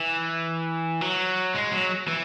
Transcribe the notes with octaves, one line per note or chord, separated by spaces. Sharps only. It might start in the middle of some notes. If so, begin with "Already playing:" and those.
Already playing: E3
F#3
G#3
F#3
E3